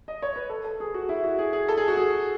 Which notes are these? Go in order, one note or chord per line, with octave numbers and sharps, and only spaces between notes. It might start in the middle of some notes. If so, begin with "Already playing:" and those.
D#5
C#5
B4
A4
A4
G#4
F#4
E4
F#4
G#4
G#4
A4
G#4
F#4
G#4